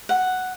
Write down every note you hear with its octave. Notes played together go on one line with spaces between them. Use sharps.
F#5